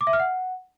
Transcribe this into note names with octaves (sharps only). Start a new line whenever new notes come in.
D6
E5
F6
F#5